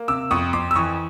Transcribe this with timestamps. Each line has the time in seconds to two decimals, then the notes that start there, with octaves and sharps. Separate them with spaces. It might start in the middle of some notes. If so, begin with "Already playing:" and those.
Already playing: A#3
0.08 C3 D6 E6
0.31 F2 C#6 D#6
0.53 F2 C6 D6
0.71 E6
0.76 E3 C#6 D#6